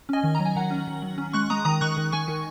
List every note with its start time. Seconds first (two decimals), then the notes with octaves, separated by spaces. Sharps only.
0.09 C#4 D#5 G#5
0.23 D#3
0.35 F#3 A#5
0.45 G#5
0.56 D#3 F#5 A#5
0.71 C#4
0.87 D#3
1.02 F#3
1.18 C#4
1.33 G#3 C#6 F#6
1.50 G#3 A#5 D#6
1.65 D#3 A#5 D#6
1.81 D#3 C#6 F#6
1.97 D#3
2.12 D#3 G#5 C#6
2.28 D#3